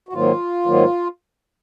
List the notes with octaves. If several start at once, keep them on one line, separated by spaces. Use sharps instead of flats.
F#4
G#2 D#3 F#3 A#3 F4
G#2 D#3 F#3 A#3